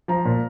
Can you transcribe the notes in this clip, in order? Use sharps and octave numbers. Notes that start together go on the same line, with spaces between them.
F3 A#5
A#2